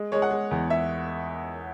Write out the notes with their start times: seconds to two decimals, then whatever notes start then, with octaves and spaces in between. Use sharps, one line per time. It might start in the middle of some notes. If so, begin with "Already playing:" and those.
Already playing: G#3
0.12 G#3 C#5
0.22 F#5
0.31 G#3
0.51 E2
0.70 E5